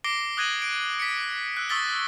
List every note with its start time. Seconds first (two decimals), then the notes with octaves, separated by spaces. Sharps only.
0.04 D6 A#6 C7 D7 G7
0.37 D#6 F#6 G#6 A#6 D#7 F#7
0.62 D7
1.00 B6 C#7
1.57 E6 F#6
1.69 C#6 D#6 E6 A6 B6 G7